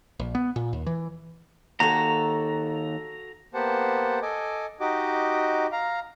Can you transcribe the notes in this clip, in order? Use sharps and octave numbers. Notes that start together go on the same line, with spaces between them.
A#1
B3
A#2
D#2
E3
D#2 F#4 A4 A#5
A#3 B3 G4 C5 F#5 A5
A4 D#5 G#5 D6
D#4 F#4 G4 D#5 D6
F5 A#5